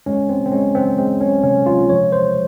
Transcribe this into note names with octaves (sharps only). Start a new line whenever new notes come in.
G#3 C#4
C4
C4
G#3 C#4
C4
G#3 C4
C#4
C3 C#4
F4
F3 C#5
C5